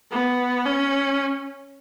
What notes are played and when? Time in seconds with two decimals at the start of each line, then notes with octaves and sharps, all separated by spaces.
0.11 B3
0.65 C#4